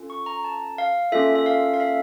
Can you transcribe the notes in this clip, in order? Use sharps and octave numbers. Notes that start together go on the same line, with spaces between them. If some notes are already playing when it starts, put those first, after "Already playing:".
Already playing: C#4 F4 A4
C#6
A#5
A5
F5
A#3 C#4 F4 A4 E5
E5
F5
F5
E5